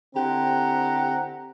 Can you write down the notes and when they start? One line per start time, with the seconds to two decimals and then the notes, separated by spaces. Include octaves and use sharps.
0.15 D3 C4 E4 G4 F#5 A#5